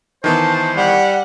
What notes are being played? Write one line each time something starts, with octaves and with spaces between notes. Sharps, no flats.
D#3 E3 B3 C5 A5
G3 F#5